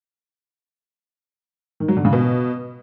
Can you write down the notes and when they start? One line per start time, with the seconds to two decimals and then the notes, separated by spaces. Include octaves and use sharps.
1.80 D#3
1.88 F#3
1.97 D3
2.05 C#3
2.13 B2